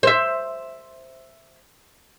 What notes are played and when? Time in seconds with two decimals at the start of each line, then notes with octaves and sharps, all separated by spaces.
0.03 C5 E5